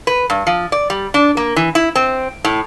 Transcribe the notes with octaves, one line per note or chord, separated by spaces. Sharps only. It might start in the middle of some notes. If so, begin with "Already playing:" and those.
B4
G2
F3
D5
G3
D4
A#3
E3
E4
C4
A2